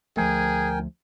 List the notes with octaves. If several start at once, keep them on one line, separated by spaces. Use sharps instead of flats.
D2 F3 A3 G#4 A#4 G5 G#5